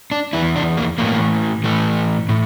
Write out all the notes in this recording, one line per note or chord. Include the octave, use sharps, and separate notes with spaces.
D4
E2 E3 E4
D4
A#3
A2 E3 A#3
A2 E3 A3
A2